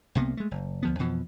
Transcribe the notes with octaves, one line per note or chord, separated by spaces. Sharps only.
C2 C3 A#3 B3
G#3 A3
F#1
D2 F3 B3
F2 B2 E3 F3